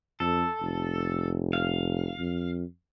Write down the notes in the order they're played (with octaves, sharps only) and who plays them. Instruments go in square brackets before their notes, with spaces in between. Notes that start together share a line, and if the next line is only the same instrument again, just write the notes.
[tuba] F2 [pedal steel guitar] A4
[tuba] F1
[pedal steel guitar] F5
[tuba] F2